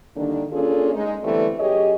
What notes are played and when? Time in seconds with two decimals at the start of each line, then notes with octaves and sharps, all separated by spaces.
0.16 D3 D#3 G3 A#3 D4
0.52 A#3 C#4 D4 F4 G#4 A4
0.93 G#3 D#4
1.23 D3 E3 G3 A3 B3 C4
1.60 F#2 G4 G#4 C#5 D#5